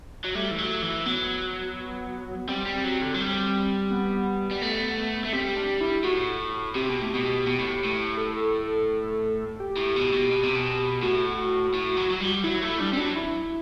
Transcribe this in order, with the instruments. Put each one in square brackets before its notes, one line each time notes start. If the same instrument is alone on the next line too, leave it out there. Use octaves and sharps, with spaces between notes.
[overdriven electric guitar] F#3
[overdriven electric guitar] G3 [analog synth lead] A3
[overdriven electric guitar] E3
F#3
E3
[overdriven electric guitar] F#3 [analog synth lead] B3
[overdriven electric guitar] G3 [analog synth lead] C4
[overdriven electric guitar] G3
F#3
D3
F#3
G3
[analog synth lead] B3
[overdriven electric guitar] G3
A3
A3
[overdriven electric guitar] G3 [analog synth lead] C4
[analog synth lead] D4
E4
[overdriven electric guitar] A2 [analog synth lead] F#4
[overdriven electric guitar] C3 [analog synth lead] G4
[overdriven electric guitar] B2
A2
B2
B2
A2
A2
[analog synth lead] A4
G4
[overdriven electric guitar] A2
B2
B2
B2
C3
B2
[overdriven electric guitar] A2 [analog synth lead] F#4
[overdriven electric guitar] A2
F#3
F#3
G3
[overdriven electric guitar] F#3 [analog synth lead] E4
[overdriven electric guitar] A3 [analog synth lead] E4
[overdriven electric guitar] G3 [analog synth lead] D4
[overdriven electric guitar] G3 [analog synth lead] C4
[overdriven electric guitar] F#3 [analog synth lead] D4
[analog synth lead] E4